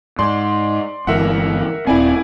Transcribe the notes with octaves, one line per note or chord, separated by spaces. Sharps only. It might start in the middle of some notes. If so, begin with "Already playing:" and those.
G#2 D5 C6
G1 E3 G#3 A#4 E5 F#5
D#1 C4 E4 D5 G#5